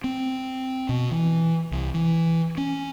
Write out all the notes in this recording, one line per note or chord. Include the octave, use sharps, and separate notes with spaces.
C4
B2
E3
C2
E3
C#4